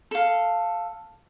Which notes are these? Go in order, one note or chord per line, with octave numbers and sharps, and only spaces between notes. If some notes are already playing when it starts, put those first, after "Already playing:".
A4 F5